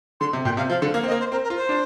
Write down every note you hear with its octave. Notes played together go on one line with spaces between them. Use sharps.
D3 C6
C3
A#2 G5
C3 F5
F3 F5
D3
A#3 F5
C4 D#5
A#3
C5
C4 A#4
A#4
F4
C5
D4